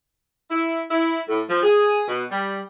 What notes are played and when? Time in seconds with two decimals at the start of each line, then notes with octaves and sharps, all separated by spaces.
0.50 E4
0.90 E4
1.28 A2
1.49 F3
1.63 G#4
2.08 B2
2.31 G3